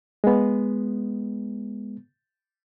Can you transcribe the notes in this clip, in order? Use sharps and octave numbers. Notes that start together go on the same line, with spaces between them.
G#3 B3